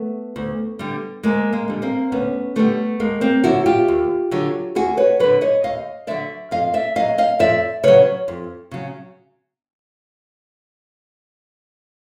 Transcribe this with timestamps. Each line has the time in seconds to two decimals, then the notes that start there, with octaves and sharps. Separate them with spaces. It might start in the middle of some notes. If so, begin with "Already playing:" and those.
Already playing: A3 B3
0.36 D2
0.79 D3 G3
1.23 D2 G#3 A#3
1.53 G#3 A#3
1.68 D3 G3
1.82 A#3 C4
2.12 D2 B3 C#4
2.56 D3 G3 A3 B3
3.00 D#2 G#3 A#3
3.21 A#3 C4
3.44 D3 F#3 E4 F#4
3.66 F4 G4
3.88 D#2
4.31 D3 F#3
4.75 D#2 F#4 G#4
4.97 B4 C#5
5.20 D3 F#3 B4 C#5
5.41 C#5 D#5
5.63 D#2 D#5 F5
6.07 D3 F#3 D5 E5
6.51 F2 D#5 F5
6.74 D5 E5
6.96 C#3 F#3 D#5 F5
7.18 D#5 F5
7.39 F2 D5 E5
7.83 C#3 F#3 B4 C#5
8.28 F2
8.71 C#3 F#3